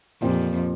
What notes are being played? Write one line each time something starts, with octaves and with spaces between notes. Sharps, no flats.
F2 A#2 F3 C4 G4